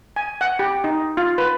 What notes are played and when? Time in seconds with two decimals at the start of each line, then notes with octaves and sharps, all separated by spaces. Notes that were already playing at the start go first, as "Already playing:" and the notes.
0.16 G#5
0.41 F#5
0.59 G4
0.84 D#4
1.17 F4
1.38 B4